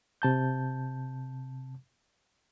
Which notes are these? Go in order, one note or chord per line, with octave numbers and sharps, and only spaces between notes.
C3 A5 G6